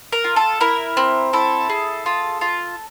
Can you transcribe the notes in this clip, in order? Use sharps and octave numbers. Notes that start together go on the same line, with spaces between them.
A#4
F4
A4
E4 A#4
C4
E4 A4
G#4
F4
F4